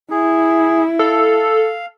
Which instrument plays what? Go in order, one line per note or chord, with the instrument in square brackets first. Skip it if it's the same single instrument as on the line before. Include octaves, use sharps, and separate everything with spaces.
[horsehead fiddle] E4 [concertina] G#4
[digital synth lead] A4 [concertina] F5